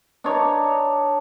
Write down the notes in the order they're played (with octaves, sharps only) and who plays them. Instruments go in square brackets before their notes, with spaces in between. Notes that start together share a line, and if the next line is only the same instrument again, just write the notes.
[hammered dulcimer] D4 D#4 C#5